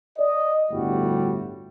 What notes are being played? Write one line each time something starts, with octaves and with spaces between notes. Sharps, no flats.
D5 D#5
G1 D2 A2 G3 F#4